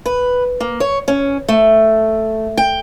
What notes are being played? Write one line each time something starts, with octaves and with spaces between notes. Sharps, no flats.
B4
A#3
C#5
C#4
A3
G5